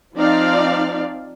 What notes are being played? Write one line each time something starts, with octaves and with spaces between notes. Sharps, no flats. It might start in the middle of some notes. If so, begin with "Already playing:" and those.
F3 C4 D#4 D5 F5